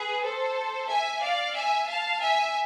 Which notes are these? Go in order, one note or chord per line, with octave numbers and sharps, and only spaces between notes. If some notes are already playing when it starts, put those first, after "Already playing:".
Already playing: G#4 B4
A4 C5
E5 G#5
D5 F5
E5 G#5
F5 A5
E5 G#5